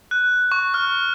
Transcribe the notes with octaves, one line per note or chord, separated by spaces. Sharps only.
F#6
C#6
F6